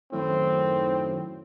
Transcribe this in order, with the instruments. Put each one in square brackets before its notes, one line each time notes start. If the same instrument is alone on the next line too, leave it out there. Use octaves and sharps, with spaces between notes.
[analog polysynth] F#2 D#3 F#3 [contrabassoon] A2 [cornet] C4